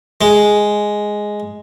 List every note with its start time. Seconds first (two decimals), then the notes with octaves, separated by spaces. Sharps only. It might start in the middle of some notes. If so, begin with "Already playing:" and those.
0.21 G#3